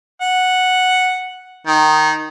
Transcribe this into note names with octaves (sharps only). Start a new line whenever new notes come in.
F#5
D#3